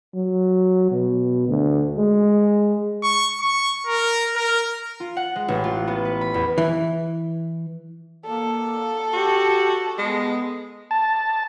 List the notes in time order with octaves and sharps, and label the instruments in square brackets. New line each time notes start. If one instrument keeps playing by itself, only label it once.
[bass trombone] F#3
B2
D2
G#3
[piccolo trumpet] C#6
C#6
A#4
A#4
[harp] F4
F#5
G#3
A1
F4
B3
B4
B5
E2
[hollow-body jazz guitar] E3
[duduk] A#3 [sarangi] A4
[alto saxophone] F#4 [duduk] G4
[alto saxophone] G#3 [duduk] B3
[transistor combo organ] A5